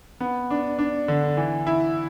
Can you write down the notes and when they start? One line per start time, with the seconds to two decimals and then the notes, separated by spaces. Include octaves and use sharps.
0.20 B3
0.50 D4
0.79 D4
1.08 D3
1.37 E3
1.67 E4